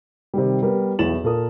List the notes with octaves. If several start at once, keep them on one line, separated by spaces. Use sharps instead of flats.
C3 D#3 G3
G3 B3 A#4
B1 E2 E4 A6 E7 F#7
A#2 A4 A#4 D#6